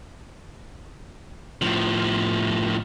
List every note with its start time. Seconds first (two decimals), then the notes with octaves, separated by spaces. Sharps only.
1.62 A2 F3